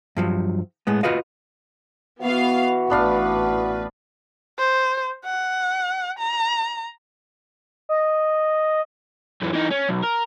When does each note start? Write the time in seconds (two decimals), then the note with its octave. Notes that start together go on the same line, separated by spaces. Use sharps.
0.17 G2 F3 F#3
0.87 A2 G#3 B3
1.03 F4 F#4 B4 D#5 F5
2.22 E3 B3 F#4 F5
2.90 A1 B3 D4 B4 F5
4.59 C5
5.25 F#5
6.19 A#5
7.89 D#5
9.42 F#2 E3
9.53 E3 D#4
9.71 C#4
9.89 B1
10.03 A#4